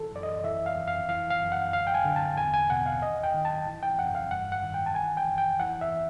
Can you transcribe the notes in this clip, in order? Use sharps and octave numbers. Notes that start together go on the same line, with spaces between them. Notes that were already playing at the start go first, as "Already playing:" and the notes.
Already playing: E3 A4
F#2 D5
D#5
E3 E5
F5
F2
F5
E3 F5
F5
F#2
F#5
D2 F5
G5
G#5
D3
A5
E2 G#5
G#5
B2 F#5
F5
D#2 D#5
G5
D#3
A5
E3
G5
F2 F#5
F5
G2 F#5
F#5
D#3
G5
A5
E3 G#5
G5
F2
G5
E3 F#5
E5